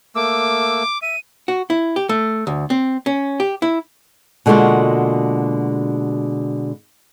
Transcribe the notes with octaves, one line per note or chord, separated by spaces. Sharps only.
A3 A#3 D6 E6
E5 D#7
F#4
E4
G4
A3
D2
C4
C#4
G4
E4
B2 D3 G#3 A#3 F4 F#4